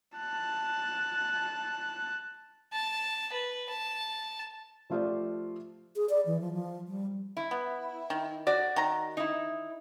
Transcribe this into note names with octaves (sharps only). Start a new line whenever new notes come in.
A5 F#6
A5
B4
A5
F3 A3 F4 G4 C5 D5
G#4
D5
E3
F3
F3
G3
E4
B3
D#3
F#4 D5
D#3 A#5
D#4 E4